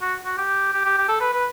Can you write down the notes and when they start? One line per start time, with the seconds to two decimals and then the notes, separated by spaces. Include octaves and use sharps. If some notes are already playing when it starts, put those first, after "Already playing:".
0.02 F#4
0.25 F#4
0.37 G4
0.73 G4
0.85 G4
0.98 G4
1.09 A4
1.21 B4
1.33 B4